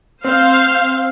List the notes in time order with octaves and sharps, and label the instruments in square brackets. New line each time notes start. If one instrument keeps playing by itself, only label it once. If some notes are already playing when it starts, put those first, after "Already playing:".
[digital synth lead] C4 [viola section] C5 F5